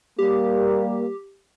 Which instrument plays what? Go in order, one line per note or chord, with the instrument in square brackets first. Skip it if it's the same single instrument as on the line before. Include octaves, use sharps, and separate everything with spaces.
[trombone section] G3 A#3 [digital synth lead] G4